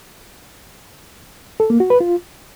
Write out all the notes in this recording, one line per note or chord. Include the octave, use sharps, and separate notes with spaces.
A4
A#3
F#4
B4
F4